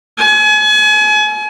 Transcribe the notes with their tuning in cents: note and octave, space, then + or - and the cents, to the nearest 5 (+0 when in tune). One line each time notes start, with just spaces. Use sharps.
G#5 +35